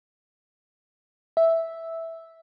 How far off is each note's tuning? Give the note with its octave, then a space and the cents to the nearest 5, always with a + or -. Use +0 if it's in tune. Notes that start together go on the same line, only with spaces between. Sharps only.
E5 -5